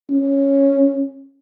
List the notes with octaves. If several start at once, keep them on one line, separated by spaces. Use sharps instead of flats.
C#4